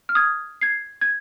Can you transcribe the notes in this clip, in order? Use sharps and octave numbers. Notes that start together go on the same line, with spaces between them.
F6
D#6 G#6
G#6 C7
G#6